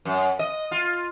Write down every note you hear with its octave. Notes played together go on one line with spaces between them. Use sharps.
F#2
D#5
F4